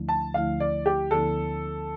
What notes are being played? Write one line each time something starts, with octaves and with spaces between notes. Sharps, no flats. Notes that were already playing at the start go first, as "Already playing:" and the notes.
Already playing: D2 D3 F3 A3 E4
A5
D2 D3 F3 A3 E4 F5
D5
G4
D2 D3 F3 B3 E4 A4